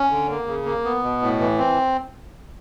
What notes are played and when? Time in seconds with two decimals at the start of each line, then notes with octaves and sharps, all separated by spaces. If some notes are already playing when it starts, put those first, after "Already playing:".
Already playing: C#4
0.10 D3
0.29 A#3
0.47 C#3
0.66 A#3
0.85 B3
1.03 B2
1.22 A2
1.40 E3
1.59 C4